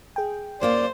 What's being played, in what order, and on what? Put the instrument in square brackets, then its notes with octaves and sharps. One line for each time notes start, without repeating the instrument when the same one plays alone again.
[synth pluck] G#4 G5
[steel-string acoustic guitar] F#2 A#3 F4 [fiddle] C5 [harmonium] D5